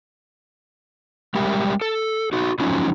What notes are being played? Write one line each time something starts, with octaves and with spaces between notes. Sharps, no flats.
G3 G#3 G4 A#4 E5 G5
A4
D#4 F#4
F3 F#3 C#4 D#4 F4